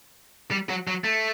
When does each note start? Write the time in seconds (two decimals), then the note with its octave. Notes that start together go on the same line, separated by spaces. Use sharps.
0.51 G3
0.69 F#3
0.88 F#3
1.04 A3